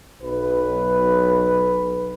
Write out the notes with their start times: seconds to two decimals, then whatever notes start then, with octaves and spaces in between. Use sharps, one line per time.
0.22 B1 B4